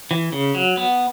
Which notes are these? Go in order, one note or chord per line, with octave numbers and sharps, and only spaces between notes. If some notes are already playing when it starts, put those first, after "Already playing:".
E3
C#3
F#3
B3